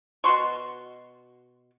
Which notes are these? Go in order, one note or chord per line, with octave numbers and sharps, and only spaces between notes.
B2 F#4 C6 C#6